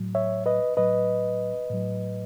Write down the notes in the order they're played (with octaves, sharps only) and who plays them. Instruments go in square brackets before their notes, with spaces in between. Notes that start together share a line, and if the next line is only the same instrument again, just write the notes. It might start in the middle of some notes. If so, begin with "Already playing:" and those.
Already playing: [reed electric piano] A2 F#3
C#5 E5
B4 D#5
A2 F#3 B4 D#5
A2 F#3